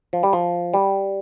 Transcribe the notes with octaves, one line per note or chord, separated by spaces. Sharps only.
F3
G3
F3
G3